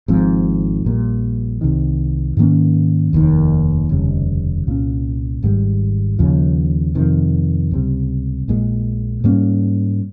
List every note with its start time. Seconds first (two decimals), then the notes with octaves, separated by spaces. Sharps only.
0.08 G#1 G#2 F3 C4
0.85 A#1 A#2 G3
1.61 C2 C3 D#3
2.37 G#2 D#3 A#3 C#4
3.13 F1 D#2 D#3
3.89 F1 D#2 C#3 G3
4.67 C2 A#2 G#3 C#4
5.43 G#1 G#2 G3
6.19 D#2 C#3 F3
6.95 F2 C3 D#3
7.71 C#2 C3 G3
8.48 A#1 A#2 G#3
9.24 G#2 G3 A#3 C#4